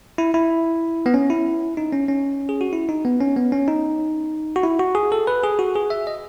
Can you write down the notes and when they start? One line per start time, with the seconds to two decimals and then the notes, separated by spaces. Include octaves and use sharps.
0.18 E4
0.34 E4
1.06 B3
1.14 C#4
1.30 E4
1.77 D#4
1.93 C#4
2.08 C#4
2.49 G#4
2.61 F#4
2.73 E4
2.89 D#4
3.05 B3
3.20 C#4
3.37 B3
3.52 C#4
3.68 D#4
4.56 F#4
4.63 E4
4.80 F#4
4.95 G#4
5.12 A4
5.27 B4
5.44 G#4
5.59 F#4
5.76 G#4
5.90 E5
6.07 D#5